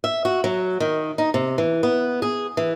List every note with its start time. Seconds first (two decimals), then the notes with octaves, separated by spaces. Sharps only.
0.04 E5
0.25 F#4
0.44 F#3
0.80 D#3
1.18 D#4
1.34 C3
1.58 E3
1.83 B3
2.22 G#4
2.57 E3